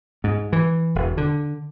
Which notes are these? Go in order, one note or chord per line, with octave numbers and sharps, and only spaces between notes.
G#2
E3
E1
D3